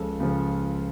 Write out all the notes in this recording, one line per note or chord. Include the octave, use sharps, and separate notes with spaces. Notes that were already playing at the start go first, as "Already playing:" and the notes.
Already playing: C#2 C#3 F3 A4
C#2 C#3 F3